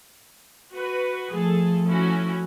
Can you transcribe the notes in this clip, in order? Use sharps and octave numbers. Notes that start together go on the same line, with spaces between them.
F#4 B4
F3 A3 G#4 A4
C#4 E4 F#4